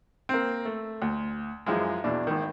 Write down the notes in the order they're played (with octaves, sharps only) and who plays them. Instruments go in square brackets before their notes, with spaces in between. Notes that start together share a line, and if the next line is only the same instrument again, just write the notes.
[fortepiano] A#3 C4
A3
D2
F#2 E3 F3 G#3
E2 B2 D4
G#1 D#3